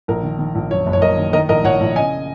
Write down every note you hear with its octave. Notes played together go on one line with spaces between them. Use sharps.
A#1 A#4
D#3
D#3
A#1
F#2 C#5
F#1
C#5
F#1 A#4 D#5
D#3
D#3 A#4 D#5
A#1 A#4 D#5
A#1 C#5 F#5
A#1
C#3 D#5 G#5